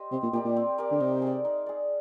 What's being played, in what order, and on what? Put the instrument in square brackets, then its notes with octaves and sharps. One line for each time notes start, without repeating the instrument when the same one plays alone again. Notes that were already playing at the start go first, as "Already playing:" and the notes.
Already playing: [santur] G4 C5 D#5
[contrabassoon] C3 [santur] C4
[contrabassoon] A#2
[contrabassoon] A#2 [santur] G4 A#4 D5
[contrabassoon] A#2
[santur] C4
G4 A#4 D5
[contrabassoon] D3
[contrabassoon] C3 [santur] D#4
[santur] G#4 D5
D#4
G#4 D5